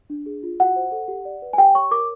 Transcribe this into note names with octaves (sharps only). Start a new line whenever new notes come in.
D4
G#4
F4
F#4 F#5
C5
A4
G4
D5
B4
G#5
G4 G5
C#5 C#6
A#4 D6